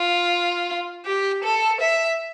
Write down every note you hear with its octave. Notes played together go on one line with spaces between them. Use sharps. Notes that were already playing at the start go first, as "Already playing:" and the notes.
Already playing: F4
G4
A4
E5